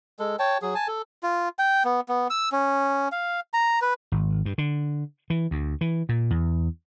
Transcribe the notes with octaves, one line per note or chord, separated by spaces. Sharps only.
G#3 A4
C#5 G5 A5
F#3 G#4
G#5 A5
A4
F4
G5
B3
B3
E6
C#4
F5
A#5
B4
G#1
G2
D3
E3
D2
E3
A#2
E2